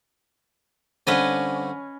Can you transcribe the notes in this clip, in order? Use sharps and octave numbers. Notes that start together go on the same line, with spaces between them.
G2 D3 C4 C#4 B4 D#5